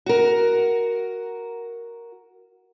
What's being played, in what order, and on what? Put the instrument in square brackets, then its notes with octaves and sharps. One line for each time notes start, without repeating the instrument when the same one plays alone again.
[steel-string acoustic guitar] F#4 A#4